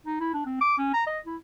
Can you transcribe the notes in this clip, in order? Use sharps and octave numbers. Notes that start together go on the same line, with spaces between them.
D#4
E4
D4
C4
D6
C#4
A#5
D#5
E4